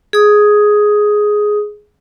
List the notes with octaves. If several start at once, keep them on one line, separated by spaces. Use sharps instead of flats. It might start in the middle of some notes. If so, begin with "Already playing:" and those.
G#4 D#6